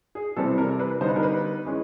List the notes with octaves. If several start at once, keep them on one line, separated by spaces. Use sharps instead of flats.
G#4
C3 E3 G3 C4 A4
A#4
B4
D3 G3 B3 D#4 C5
B4
A#4
B4
E3 G#3 C#4